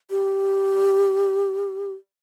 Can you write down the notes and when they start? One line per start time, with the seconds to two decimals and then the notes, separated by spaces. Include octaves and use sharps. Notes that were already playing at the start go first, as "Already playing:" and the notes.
0.10 G4